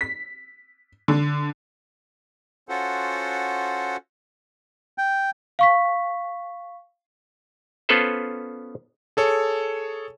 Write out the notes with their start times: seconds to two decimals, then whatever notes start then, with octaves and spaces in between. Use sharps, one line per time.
0.01 B6
1.08 D3
2.69 C#4 F4 F#4 A4 C5 F#5
4.98 G5
5.59 F5 C#6 B6
7.89 B3 C#4 F4 A4 B4 C5
9.17 G#4 A4 C#5